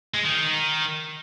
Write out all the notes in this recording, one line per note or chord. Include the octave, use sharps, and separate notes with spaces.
G#3
D#3
D#3